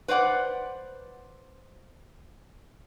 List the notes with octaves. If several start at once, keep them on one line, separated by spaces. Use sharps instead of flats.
B4 C5 D5 F#5